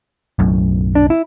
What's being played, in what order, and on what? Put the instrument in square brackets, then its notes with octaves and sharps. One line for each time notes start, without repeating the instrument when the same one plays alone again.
[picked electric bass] B1 F#2 A2
[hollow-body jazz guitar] D4
E4